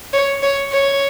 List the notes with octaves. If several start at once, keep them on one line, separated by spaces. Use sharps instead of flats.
C#5
C#5
C#5